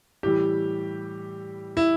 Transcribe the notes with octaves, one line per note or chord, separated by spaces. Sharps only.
A2 E3 G3 G4
E4